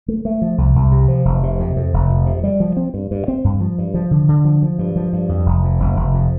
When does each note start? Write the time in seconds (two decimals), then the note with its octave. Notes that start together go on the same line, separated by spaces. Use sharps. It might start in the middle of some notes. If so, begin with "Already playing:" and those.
0.08 A3
0.25 A3
0.42 F3
0.58 C2
0.75 C2
0.92 C3
1.08 F3
1.25 F1
1.43 C3
1.60 F2
1.76 F2
1.94 F1
2.10 F2
2.26 C3
2.44 G3
2.60 F3
2.77 C4
2.94 G2
3.11 G2
3.28 C4
3.44 G2
3.60 F3
3.78 G2
3.94 F3
4.11 D3
4.28 D3
4.45 F3
4.62 F3
4.79 G2
4.96 F3
5.13 G2
5.29 F2
5.46 F1
5.63 F2
5.80 F1
5.96 F1
6.14 F2